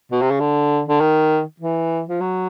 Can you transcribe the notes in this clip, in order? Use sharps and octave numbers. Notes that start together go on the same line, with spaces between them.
B2
C3
C#3
D3
D3
D#3
E3
F3
F#3